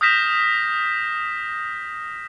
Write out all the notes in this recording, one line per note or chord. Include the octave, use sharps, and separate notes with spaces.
D#6 F6 G6 A#6 B6 E7